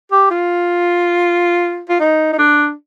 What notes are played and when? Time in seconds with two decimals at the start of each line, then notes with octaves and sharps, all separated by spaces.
0.11 G4
0.30 F4
1.89 F4
2.00 D#4
2.33 D#4
2.38 D4